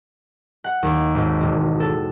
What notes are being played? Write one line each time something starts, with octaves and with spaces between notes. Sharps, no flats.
F#5
D#2
G#1
E1
A4